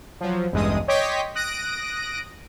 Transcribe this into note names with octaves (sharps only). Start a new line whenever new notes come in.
F3 F#3
A1 E2 G2 G#3 D#6
C#5 D#5 G5 C6 D6 B6
D#6 F#6 A#6 D7